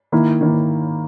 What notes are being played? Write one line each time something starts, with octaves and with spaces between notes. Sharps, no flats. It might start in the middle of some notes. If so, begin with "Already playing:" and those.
D#3 A#3 E4
D#3 A#3 E4